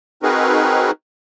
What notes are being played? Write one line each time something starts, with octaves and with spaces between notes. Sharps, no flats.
C4 D#4 F#4 G#4 A#4 B4